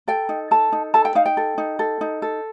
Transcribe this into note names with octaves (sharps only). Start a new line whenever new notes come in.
A4 G5
D#4
A4 A5
D#4
A4 A5
G5
D#4 F5
G5
A4
D#4
A4
D#4
A4